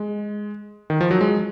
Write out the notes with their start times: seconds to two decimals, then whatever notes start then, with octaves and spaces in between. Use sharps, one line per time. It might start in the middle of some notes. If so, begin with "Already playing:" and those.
Already playing: G#3
0.90 D#3
1.01 F3
1.11 F#3
1.21 G#3